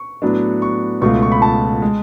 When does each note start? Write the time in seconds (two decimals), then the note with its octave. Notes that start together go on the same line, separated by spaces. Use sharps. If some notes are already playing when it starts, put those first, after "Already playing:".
Already playing: C#6
0.22 A2 F#3 B3 D4
0.62 C#6
1.01 C#2 B2 A3 F4 C#6
1.22 C#6
1.32 B5
1.42 A5
1.82 G#3